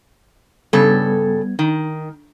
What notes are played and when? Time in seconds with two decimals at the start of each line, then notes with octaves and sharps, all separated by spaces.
0.73 G2 C#3 G3 B3 A4 G#6
1.59 D#3 D#4